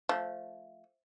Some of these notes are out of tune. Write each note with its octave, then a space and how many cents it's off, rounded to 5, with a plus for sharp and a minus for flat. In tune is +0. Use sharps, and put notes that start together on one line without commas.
F3 +0 A3 -10